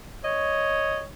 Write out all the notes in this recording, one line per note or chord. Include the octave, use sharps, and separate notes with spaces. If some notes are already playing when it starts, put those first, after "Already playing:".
C#5 D#5